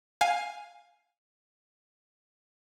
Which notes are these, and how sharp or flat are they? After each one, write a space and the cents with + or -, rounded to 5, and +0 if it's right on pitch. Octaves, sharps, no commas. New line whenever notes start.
F5 +10 G#5 +0